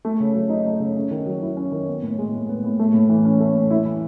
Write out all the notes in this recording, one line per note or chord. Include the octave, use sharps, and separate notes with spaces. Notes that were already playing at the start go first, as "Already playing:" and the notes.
A3
C#3
F#3
D#4
A3
C#3
C#4
D#3
F#3
E4
C#4
D#3
B3
A2
G#3
A2
B3
A2
A3
A2
E3
C#4
A3
A2
E4
E3